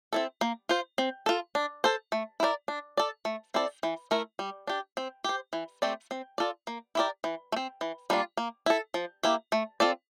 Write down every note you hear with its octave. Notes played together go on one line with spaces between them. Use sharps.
C4 E4 A4
A#3
F4 C5
C4
F4 A4
D4
A4 C5
A3
E4 A#4 D5
D4
A4 D5
A3
C4 E4 A4 D5
E3
A3 E4 A#4
G3
D4 G4
C4
G4 C5
E3
A3 C4 G4 D5
C4
F4 A4 D5
A#3
E4 G4 A#4 D5
E3
A3
C4
E3
G3 A#3 D4 F4
A#3
E4 A4
F3
A#3 E4 G4
A3
C4 F4 A4 D5